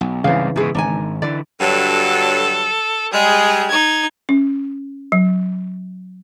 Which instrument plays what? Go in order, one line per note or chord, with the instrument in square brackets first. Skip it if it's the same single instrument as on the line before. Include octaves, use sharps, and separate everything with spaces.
[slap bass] B1
[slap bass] C2 G#2 [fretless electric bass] C#3 E3 [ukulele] F5
[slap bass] G#2 B2 [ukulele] E4 G#4
[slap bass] G#1 [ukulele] D4 D#4 G#5
[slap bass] D3 E3 [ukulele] D5
[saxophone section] G2 D3 F#3 [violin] A4
[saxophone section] G3 G#3 [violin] G#4
[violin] D#4 G#6
[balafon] C#4
F#3